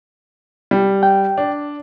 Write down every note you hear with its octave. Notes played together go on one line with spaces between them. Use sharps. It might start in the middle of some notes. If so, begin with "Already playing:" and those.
G3
G5
D4